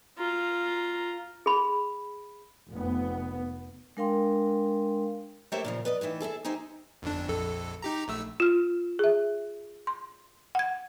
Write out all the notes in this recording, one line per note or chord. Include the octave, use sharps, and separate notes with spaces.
F4 A#5
G#4 B5
F1 B3
G#3 D4 A#4 F5 G5 C6
A3 A#3 G4 C5 C#5 E5
A#2 C#3 F3
B4 D5 D#5
A2 D#3 E3 E5
G#4 A4 D5 E5
D#4 G4 G#4 C5 E5
G1 F2 D4
A#1 F2 A4
D#4 G4 A#5
A#1 A3 E6
F4 F6
G#4 E5
C6
F#5 G#6